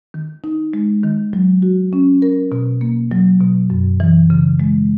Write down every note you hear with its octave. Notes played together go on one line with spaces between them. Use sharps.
D#3
D#4
G#3
D#3
F#3
F#4
C#4
A#4
B2
A#3
F#3
B2
F#2
E3
C#3
G#3